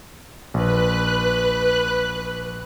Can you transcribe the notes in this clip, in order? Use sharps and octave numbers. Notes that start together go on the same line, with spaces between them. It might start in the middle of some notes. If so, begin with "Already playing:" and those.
A#1 B4 F#6